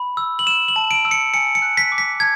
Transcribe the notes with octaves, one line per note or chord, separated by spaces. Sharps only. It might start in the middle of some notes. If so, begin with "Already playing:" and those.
Already playing: B5
E6
F#7
E6 E7
F#7
A5
D7
E6
C#7
G#5 C#7
C#7
F#6
B6
D6
B6
A5 G#6